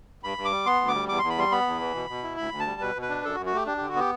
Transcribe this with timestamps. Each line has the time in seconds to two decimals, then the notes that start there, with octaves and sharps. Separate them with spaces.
0.23 G2 B5
0.38 G2
0.45 D6
0.51 G3
0.66 B3 C6
0.81 D2
0.88 D6
0.94 G3
1.09 E2 D6
1.19 E2 C6
1.30 B5
1.38 G3 C6
1.52 B3 B5
1.66 E2
1.81 E3
1.95 B2
2.10 B2
2.23 E4
2.37 D2 B5
2.52 D2
2.60 A5
2.67 G3
2.81 B2 B4
2.95 B2
3.02 B4
3.09 D4
3.24 F#2 A4
3.35 F#4
3.38 F#2
3.46 F#4
3.53 A3 G4
3.67 D4 G4
3.77 D3 G4
3.88 F#4
3.96 B3 G4